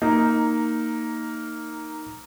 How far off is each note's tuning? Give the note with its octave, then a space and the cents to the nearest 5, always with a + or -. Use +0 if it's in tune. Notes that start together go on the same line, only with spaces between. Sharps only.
A#3 -10 D#4 +0